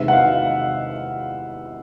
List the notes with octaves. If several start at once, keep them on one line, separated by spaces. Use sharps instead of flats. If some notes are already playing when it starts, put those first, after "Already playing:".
Already playing: E2 C3 D#3 G#3 B3 E5
F#5
F5